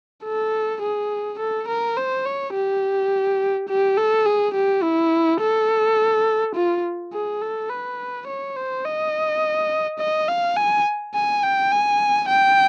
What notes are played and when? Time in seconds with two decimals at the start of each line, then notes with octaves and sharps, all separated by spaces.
0.24 A4
0.82 G#4
1.39 A4
1.68 A#4
1.97 C5
2.26 C#5
2.54 G4
3.69 G4
3.97 A4
4.26 G#4
4.54 G4
4.83 E4
5.41 A4
6.55 F4
7.13 G#4
7.42 A4
7.70 B4
8.27 C#5
8.56 C5
8.85 D#5
9.99 D#5
10.28 F5
10.56 G#5
11.15 G#5
11.43 G5
11.72 G#5
12.29 G5